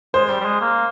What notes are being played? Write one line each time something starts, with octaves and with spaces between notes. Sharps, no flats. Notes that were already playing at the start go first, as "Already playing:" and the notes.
G#3 C5
G3
G3
G#3
A#3